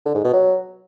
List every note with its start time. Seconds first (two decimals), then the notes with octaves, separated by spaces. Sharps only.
0.06 D3
0.15 G#2
0.24 B2
0.33 F#3